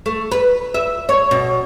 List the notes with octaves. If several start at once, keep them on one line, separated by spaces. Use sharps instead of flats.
A3
B4
E5
C#5
B2